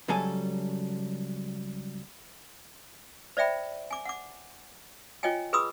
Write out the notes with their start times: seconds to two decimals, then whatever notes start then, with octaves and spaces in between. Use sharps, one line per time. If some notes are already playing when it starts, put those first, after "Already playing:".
0.08 C#2 C#3 F#3 G3 A4 G#5
3.37 C5 D5 E5 G5 B5
3.91 G#5 D6
4.05 F#5 D6
5.23 F4 C#5 D#5 G5 G#5
5.53 G#4 B4 B5 C6 D#6 E6